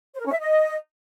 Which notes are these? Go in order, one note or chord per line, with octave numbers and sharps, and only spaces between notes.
C5
A#4
C#4
E5
D#5